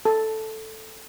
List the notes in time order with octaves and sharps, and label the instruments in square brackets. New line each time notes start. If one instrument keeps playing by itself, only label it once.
[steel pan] A4